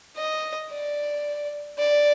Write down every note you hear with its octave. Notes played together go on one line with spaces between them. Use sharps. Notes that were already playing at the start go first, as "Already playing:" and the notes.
D#5
D5
D5